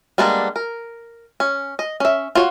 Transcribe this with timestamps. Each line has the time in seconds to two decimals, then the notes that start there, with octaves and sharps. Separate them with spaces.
0.18 G3 G#3 A#3 B3 D4
0.56 A#4
1.40 C#4
1.79 D#5
2.00 C#4 E5
2.35 F4 F#4 C#5